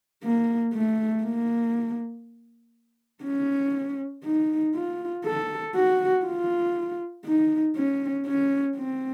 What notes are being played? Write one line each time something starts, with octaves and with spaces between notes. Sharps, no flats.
A#3
A3
A#3
C#4
D#4
F4
A4
F#4
F4
D#4
C#4
C#4
C4